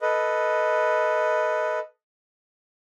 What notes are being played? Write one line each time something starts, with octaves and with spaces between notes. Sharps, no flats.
A4 B4 D#5